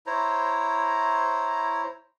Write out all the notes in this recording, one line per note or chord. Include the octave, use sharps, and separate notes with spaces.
E4 C5 C#5 A#5